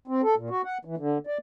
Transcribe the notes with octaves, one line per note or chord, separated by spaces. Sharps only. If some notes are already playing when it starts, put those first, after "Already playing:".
C4
A4
A#2
F#4
F#5
E3
D3
D5